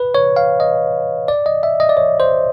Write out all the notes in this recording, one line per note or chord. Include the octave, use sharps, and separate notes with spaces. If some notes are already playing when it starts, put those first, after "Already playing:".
Already playing: B4
C#5
F5
D#5
D5
D#5
E5
D#5
D5
C#5
C5